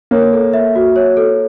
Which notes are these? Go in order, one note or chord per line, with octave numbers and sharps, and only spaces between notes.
A#3 C#5
A4
E5
F#4
C#5
A4